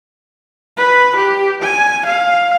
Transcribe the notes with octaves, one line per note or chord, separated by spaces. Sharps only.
B4
G4
G#5
F5